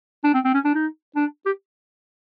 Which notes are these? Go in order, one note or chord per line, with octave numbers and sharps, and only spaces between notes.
D4
C4
C4
C#4
D4
D#4
D4
G4